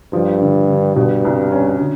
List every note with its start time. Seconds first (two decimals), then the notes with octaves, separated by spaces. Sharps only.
0.13 G2 F3
0.41 D3
0.69 D3
0.96 G2 B2
1.25 C2
1.52 C#4
1.79 D3